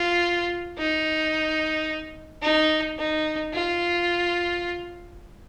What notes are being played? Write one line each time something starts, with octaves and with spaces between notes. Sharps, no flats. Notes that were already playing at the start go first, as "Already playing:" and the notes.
Already playing: F4
D#4
D#4
D#4
F4